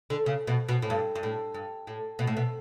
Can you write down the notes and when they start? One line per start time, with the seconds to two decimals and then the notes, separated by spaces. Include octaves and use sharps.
0.10 D3
0.26 C#3
0.47 B2
0.69 B2
0.82 A2
0.90 G2
1.15 G2
1.23 A2
1.54 G2
1.87 A2
2.19 B2
2.27 A2
2.37 B2